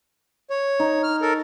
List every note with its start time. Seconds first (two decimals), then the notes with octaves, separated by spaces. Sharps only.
0.50 C#5
0.80 D#4
1.03 F6
1.22 A4 A#4